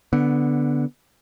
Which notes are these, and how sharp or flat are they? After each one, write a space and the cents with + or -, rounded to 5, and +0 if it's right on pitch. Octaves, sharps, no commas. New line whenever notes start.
D3 -5 B3 +0